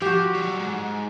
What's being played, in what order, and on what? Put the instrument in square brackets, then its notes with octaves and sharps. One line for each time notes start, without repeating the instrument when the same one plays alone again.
[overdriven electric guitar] F3 [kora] F#4 G4
[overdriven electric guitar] F#3 G3
G#2